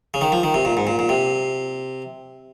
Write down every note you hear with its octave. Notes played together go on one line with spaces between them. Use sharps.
C#3
D#3
F3
D#3
C3
A#2
G#2
A#2
A#2
C3